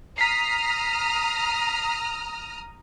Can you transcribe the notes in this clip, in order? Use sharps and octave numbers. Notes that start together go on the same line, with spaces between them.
A#5 D#6 F6 B6 C7